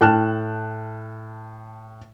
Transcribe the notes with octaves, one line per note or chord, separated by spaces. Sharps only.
A2 G5 A5 F6 F#6 E7